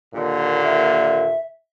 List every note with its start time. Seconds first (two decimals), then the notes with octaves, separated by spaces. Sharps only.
0.13 D#2 A#2 D3
0.64 E5